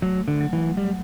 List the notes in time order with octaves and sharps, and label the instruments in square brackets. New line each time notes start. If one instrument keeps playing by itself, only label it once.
[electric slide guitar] F#3 [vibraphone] A3
[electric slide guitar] D3
[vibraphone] F#3
[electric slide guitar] E3
[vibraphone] F#3 [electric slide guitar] G3